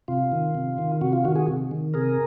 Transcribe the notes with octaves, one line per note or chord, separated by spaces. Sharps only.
C3 F4
D#3
C3
D#3
C3 F#4
F4
D#3 F#4
F#4 G#4
C3
D#3
C3 G#4 A#4